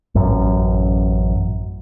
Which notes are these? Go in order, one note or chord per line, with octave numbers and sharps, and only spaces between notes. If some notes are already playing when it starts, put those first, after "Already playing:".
A1 F#2